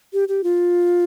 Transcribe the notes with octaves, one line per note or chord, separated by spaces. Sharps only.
G4
G4
F4